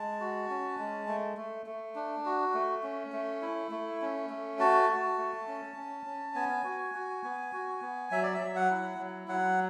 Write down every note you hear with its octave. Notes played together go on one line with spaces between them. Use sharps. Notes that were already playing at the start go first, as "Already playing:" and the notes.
Already playing: G#3 A5
F#4
C#4
G#3
A3
A3
A3
D4
F#4
A3
C#4
A3
E4
A3
C#4
A3
F#4 A5
F#4
A3
C#4
C#4
C#4
B3 G#5
F#4
F#4
B3
F#4
B3
F#3 E5
D5
E5
F#3
F#5
E4
F#3
F#3 F#5